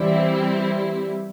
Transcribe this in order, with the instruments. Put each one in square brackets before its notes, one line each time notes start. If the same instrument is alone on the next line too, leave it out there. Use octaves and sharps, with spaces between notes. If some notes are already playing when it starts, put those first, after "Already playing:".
Already playing: [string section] E3 G3 C4 E4 [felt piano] C5 D5
[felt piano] E5
G5